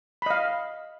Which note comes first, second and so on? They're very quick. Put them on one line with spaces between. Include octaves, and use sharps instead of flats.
B5 D#5 F5